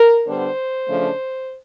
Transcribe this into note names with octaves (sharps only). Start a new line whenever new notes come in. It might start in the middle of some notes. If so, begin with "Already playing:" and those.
Already playing: A#4
D3 G3 B3 D4 C5
C#3 F3 A3 D4